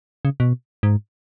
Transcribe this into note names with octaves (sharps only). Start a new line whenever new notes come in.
C#3
B2
G#2